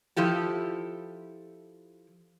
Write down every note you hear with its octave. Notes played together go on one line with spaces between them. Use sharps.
F3 E4 G4 A4